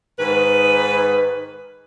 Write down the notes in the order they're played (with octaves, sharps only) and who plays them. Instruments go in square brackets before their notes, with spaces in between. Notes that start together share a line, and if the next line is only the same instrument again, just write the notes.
[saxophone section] G#2 D#3 B4